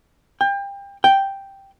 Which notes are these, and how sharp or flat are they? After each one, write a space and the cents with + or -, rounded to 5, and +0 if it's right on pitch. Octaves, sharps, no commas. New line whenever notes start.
G5 +30
G5 +0